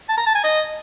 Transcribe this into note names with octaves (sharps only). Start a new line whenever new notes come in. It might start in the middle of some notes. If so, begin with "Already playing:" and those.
A5
A#5
A5
G#5
D#5